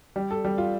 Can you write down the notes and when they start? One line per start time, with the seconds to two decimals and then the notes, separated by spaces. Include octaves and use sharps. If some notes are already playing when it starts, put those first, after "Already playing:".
0.16 G3
0.31 A4
0.45 G3
0.58 F4